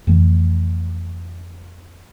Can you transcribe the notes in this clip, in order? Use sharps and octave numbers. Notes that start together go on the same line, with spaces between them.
F2 E3 A3